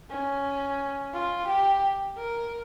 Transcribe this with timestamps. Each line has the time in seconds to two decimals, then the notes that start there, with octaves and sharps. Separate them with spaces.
0.11 C#4
1.13 F4
1.48 G4
2.17 A#4